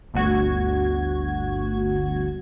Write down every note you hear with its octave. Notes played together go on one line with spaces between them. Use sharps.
G1 D2 F#4 G#6